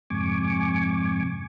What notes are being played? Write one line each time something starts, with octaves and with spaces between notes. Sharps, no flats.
F2 G#2 C3 G#5 C#6 D6